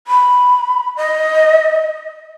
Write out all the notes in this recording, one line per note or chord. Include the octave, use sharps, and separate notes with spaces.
B5
D#5